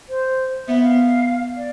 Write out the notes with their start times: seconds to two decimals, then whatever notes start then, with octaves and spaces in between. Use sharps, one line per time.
0.09 C5
0.68 B3 E5
0.83 F5
1.57 D5